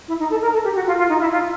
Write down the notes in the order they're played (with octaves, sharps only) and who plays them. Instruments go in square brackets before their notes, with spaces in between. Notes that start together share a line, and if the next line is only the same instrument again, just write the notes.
[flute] E4
D#4
A4
A#4
A4
G4
F#4
F4
F4
D#4
E4
F4